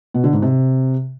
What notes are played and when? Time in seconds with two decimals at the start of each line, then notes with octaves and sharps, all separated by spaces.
0.14 B2
0.24 D3
0.33 G#2
0.42 C3